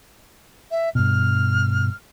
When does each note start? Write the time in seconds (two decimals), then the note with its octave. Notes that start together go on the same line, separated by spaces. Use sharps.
0.71 E5
0.95 G2 B2 F6